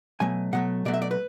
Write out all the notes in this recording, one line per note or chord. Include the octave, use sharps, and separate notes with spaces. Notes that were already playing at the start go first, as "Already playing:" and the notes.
B2 F#3 A3 G#5
B2 F#3 A3 F#5
B2 F#3 A3 D5
E5
D5
B4